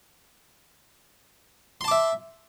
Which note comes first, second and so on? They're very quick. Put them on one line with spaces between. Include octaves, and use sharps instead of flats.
C6 A5 D6 E5